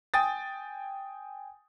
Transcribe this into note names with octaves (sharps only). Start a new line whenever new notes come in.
G5 G#5 D#6 A6